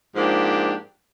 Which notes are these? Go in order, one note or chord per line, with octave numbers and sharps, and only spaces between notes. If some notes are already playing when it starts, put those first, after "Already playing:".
G#2 F3 A#3 D4 G4